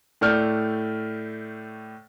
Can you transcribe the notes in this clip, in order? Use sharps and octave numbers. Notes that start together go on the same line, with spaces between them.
A2 A3 D5 F6 G6